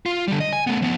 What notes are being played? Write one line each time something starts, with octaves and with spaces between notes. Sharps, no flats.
F4
D3 G3
D#5
G#5
A3 B3
F3 B3